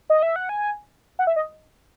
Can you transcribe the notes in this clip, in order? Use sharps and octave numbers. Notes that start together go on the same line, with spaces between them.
D#5
E5
F#5
G#5
F#5
E5
D#5